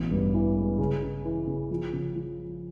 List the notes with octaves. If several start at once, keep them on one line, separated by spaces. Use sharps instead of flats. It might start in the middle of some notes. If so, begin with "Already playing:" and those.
Already playing: A1 B2
G2
E3
G#3
C#3
C#3
E3
C#3
F3
C#3
F3